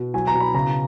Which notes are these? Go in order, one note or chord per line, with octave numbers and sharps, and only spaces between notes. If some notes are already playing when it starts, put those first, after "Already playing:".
Already playing: B2
F#3 G#5
A#5
B2
B5
C#3 A#5